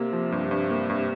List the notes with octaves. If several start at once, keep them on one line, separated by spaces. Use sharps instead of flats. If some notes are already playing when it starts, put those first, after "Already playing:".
Already playing: C3 A#3
F3
G2
G2
A#3
G2